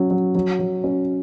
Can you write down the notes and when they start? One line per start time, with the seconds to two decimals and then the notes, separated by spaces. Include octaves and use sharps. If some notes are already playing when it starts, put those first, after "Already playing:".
Already playing: F#3 C#4
0.11 F#3
0.35 F#3
0.59 F#3
0.84 C#4